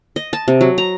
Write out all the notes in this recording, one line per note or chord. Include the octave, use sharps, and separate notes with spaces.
D#5
A5
C3
F#3
A#5